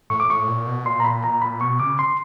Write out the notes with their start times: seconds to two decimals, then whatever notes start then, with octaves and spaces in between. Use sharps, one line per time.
0.10 A2 C#6
0.20 D6
0.29 A2 C#6
0.47 A#2
0.67 B2
0.85 A#2 C6
1.00 A#5
1.05 B5
1.24 A#5
1.42 B5
1.61 B2 C#6
1.80 C#3 D6
1.99 C6